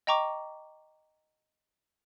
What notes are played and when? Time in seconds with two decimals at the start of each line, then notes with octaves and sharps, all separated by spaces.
0.07 D#5 G5 A#5 C#6 D6